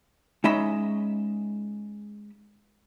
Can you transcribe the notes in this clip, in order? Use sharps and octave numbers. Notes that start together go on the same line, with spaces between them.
G#3 C#4 D#4 D#5 E5 B5